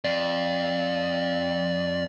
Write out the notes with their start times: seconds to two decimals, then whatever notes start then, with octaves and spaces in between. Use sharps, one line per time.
0.04 F2 D5